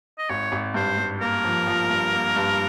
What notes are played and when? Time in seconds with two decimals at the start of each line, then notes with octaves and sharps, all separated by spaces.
0.18 D#5
0.29 G#1 C#5
0.52 G#1
0.74 G2 C5
0.98 G2
1.21 A#3 A#4
1.44 F3
1.67 F3
1.90 G2
2.13 A#3
2.36 G2